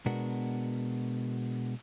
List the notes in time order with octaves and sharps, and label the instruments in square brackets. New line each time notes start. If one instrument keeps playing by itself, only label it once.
[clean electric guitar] B2 G#3 B3 D4 F#4 A#4